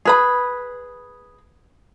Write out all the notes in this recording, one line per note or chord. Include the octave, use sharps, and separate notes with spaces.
G#4 B4 B5